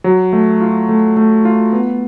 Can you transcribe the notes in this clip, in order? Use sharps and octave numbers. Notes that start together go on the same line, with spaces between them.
F#3
A3
F4
A3
A3
F4
B3